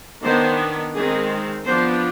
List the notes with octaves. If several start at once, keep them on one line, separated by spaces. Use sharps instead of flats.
D#3 B3 D4 C5
D#3 G#3 C4 G#4
F3 B3 D4 C5